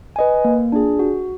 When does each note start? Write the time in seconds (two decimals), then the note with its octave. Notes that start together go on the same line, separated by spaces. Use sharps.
0.16 B4 D#5 G#5
0.45 A#3
0.72 D4 F4 G#4
0.99 F#4